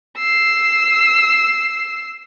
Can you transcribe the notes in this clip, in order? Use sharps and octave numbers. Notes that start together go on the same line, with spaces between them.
E6 C7